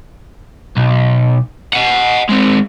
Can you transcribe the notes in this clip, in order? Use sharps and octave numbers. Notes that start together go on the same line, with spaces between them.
B1
D#5 F#5
G#3 C4